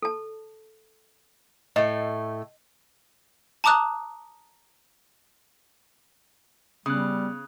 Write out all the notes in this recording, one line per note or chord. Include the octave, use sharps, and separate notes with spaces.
A4 A5
A2 A3 D#5
A5 A#5 D6 D#6 F#6
C#3 G3 B3 D#6 F#6